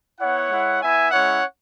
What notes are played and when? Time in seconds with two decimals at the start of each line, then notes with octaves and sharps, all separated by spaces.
0.19 B3 E4 C#5 F#5
0.50 G#3 E4
0.81 B3 E4 E5 G#5
1.11 G#3 C#4 E4 C#5 F#5